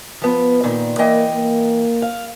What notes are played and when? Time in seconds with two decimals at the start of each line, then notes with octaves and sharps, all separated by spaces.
0.22 F3 B3
0.64 A#2 D#3
0.99 E3 A#3 D#5 G5
1.35 A#3
2.02 F5